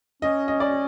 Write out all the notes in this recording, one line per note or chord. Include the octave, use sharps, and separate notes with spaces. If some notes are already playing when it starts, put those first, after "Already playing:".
C#4 D#5
D#5
D5